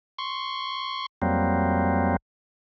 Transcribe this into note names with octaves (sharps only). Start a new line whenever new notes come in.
C6 C#6
F2 F#3 G3 A#3 C4